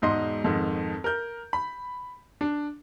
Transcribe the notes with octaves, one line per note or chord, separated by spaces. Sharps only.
E1 G#2 D#5 C6
F2 G#2 D#3
A#4 G6
B5
D4